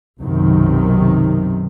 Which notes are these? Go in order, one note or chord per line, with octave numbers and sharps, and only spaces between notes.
B1 F#2 C3 D#3